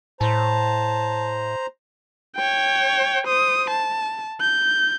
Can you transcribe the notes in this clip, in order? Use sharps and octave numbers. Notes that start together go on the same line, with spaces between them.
A2 C5 A5 A#5
C#5 G5
C5 D#6
A5
G6